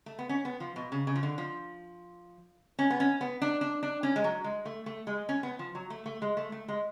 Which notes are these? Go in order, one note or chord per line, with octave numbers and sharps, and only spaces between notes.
A3
B3
C#4
B3
F3
B2
C#3
C#3
F3
D3
F3
C#4
B3
C#4
B3
D4
D4
D4
C#4
G#3
F#3
G#3
A3
A3
G#3
C#4
B3
F3
F#3
A3
A3
G#3
A3
A3
G#3